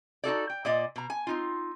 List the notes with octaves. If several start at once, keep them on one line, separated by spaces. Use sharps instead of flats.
D#4 F#4 A4 D5
G5
A#2 D5 D#5
B2 A#5
G#5
C4 D#4 F4